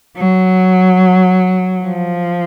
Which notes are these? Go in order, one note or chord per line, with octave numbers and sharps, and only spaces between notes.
F#3
F3